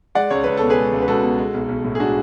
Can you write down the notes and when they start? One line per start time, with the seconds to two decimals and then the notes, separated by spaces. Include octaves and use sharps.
0.15 G#3 D5 F#5
0.31 C#2 C#5
0.44 C#2 B4
0.58 B2 A4
0.70 G#4 B4
0.77 G#3
0.93 C#2
1.02 B4
1.08 C#2 F#4 A4
1.23 B2
1.38 G#3
1.54 B1
1.69 B1
1.85 A2
1.95 G#4
1.99 G#3 D4 F#4